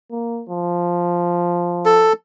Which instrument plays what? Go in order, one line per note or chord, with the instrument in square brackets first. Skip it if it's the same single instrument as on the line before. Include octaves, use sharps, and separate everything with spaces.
[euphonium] A#3
F3
[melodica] A4